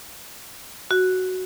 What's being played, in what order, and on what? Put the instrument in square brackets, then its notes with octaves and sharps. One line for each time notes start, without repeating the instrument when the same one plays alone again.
[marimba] F#4